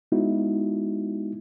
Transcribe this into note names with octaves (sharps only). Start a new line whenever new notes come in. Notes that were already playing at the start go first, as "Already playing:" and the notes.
G#3 B3 D#4 E4 F#4